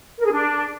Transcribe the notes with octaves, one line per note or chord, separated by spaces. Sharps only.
A#4
G#4
D4